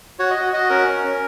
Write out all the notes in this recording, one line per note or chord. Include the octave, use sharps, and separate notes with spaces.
F#4 C#5
D#5
F#4
F#4 D#5
C#4 A#4
C#4
C#4